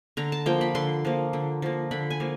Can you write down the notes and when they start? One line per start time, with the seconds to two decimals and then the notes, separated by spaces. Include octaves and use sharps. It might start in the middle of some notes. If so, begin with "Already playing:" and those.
0.17 D3 A#5
0.32 A5
0.46 F3 A#3 G5
0.61 B5
0.75 D3 C6
1.05 F3 A#3
1.33 D3
1.62 F3 A#3
1.91 D3 B5
2.10 G#5
2.20 F3 A#3